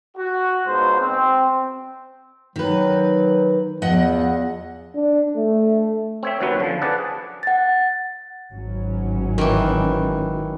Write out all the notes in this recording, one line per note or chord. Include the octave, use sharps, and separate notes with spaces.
F#4
C#2 G#2 B2 C5
C4
D#3 F#3 B4
E2 F3 D#5 F#5
D4
A3
C4 C#5 E5
D#2 F#3 C#4 B4
D3 F3
G#4 B4 D5 F#5 A5
F#5 A6
G#1 F#3 C#4
D#3 E3